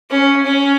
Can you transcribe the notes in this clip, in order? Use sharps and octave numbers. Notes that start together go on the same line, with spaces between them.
C#4
C#4